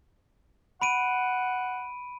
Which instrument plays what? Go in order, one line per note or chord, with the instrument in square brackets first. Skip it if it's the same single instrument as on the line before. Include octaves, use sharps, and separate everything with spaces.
[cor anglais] F#5 [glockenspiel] B5 D7 D#7